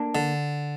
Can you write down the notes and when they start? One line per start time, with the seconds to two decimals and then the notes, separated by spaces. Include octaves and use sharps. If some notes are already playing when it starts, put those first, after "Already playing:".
Already playing: A#3 D4
0.15 D3